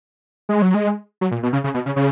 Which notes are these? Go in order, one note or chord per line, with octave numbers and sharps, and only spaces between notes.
G#3
F#3
G#3
F#3
A#2
B2
C#3
C#3
B2
C#3
C#3